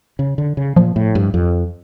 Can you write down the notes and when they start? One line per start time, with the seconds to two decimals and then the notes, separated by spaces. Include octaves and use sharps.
0.19 C#3
0.38 D3
0.57 C#3
0.77 A#2 F3
0.96 A2
1.15 G2
1.34 F2